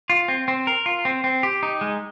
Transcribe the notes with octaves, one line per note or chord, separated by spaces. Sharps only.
F4
C4
C4
A#4
F4
C4
C4
G4
D#4
G#3